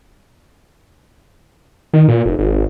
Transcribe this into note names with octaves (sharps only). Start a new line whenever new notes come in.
D#3
A#2
F1
G#1